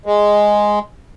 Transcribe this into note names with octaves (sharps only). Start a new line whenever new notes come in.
G#3